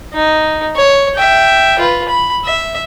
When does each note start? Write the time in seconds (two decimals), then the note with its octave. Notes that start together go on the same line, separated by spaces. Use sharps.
0.14 D#4
0.76 C#5
1.16 E5 G5
1.79 F4 B4
2.08 B5
2.45 E5